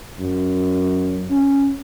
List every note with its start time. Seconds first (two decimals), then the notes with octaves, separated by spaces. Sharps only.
0.20 F#2
1.31 C#4